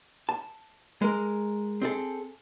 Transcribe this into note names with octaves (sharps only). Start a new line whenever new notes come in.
A5
G#3 A#4
C4 G#4 A4